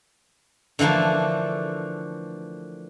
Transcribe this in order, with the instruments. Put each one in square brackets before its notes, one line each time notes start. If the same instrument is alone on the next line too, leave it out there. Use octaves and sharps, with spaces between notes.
[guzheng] D3 E3 F3 A3 A#3